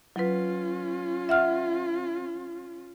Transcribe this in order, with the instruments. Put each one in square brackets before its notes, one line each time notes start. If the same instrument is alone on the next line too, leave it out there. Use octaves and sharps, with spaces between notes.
[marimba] F#3 B4 [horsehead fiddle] C#4 F4
[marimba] E5 F#5 F6